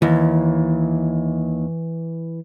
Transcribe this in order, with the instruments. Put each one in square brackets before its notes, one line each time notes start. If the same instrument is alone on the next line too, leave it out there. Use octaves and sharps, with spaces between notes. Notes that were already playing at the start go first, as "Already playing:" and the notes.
[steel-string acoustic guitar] D#2 [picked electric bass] E3